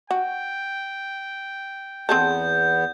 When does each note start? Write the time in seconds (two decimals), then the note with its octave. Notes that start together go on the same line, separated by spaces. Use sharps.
0.11 F#4 G5
2.09 E2 B3 C4 G#4 A4 G6